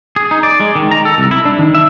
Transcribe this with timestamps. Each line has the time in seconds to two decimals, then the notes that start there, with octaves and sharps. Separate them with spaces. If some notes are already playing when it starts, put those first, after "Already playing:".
0.16 G#4
0.31 D#4
0.43 D5
0.60 G#3
0.76 D#3
0.91 A#5
1.05 A4
1.18 C2
1.31 E4
1.45 D4
1.59 D#3
1.74 E5